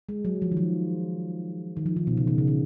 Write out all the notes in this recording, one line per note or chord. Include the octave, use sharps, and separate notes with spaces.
G#3
F#3
F3
D#3
F3
D#3
F3
D#3
B2
C#3
D#3
C#3
D#3